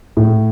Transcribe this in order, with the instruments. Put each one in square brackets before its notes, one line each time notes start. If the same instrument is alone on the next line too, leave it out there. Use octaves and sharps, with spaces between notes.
[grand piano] A2